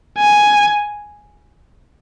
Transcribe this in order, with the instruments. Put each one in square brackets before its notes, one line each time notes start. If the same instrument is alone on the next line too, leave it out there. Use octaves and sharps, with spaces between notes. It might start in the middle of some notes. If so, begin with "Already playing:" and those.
[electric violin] G#5